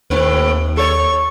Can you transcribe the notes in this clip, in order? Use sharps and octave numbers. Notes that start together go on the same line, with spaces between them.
D#2 A2 C4 B4
A4 C#5 C#6